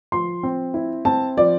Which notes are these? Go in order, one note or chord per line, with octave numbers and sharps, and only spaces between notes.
F3 C6
C4
E4
C4 A5
F3 D5